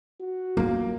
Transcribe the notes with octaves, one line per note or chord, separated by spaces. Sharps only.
F#4
F#3 A#3 F4